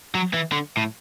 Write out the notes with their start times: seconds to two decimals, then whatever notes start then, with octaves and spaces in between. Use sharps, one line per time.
0.15 F#3
0.34 E3
0.52 D3
0.77 A2